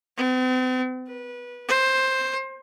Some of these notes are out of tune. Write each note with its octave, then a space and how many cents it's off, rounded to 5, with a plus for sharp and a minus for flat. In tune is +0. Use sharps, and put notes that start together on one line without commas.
C4 -45
B4 -20
C5 +10